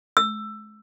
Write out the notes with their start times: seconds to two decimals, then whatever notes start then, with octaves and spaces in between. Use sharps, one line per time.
0.17 E6